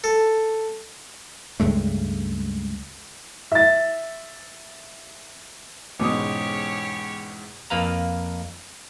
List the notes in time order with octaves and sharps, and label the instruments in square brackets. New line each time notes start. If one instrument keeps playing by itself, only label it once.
[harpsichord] A4
[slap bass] C#2 G2 G#3 A3
[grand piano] E5 A6
[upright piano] E2 G#2 C#4 [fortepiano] B2 [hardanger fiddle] G4 C#5 [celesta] D6 D#6
[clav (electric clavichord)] F2 A#3 B4 F5 A#5